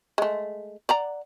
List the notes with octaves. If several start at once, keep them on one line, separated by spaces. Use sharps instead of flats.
G#3 A3
D5 F#5 A#5